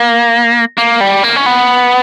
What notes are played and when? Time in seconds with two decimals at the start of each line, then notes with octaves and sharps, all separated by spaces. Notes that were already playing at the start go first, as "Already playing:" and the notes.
Already playing: A#3
0.78 A#3
1.00 G3
1.23 A#3
1.36 C#4
1.46 B3